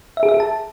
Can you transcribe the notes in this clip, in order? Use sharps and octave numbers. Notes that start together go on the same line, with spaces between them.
E5
G#4
E5
G#4
A5